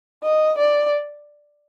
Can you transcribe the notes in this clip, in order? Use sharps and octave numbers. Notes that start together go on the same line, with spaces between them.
D#5
D5